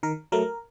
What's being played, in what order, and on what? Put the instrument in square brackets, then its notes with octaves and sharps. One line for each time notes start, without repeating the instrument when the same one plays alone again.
[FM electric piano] D#3 A#4
F#3 A3 A#4